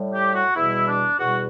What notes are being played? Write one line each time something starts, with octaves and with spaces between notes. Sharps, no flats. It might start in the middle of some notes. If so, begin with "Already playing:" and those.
Already playing: A2 G3
G4
F#4
E2 B2 G3 E4
D4
E2 B2 G3 F#4